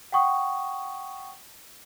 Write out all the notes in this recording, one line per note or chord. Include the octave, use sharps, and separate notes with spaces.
F#5 G5 C#6 D#6